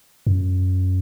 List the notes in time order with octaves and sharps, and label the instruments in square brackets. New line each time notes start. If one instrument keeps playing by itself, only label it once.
[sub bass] F#2